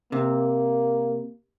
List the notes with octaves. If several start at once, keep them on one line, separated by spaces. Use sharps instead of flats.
C3 A#3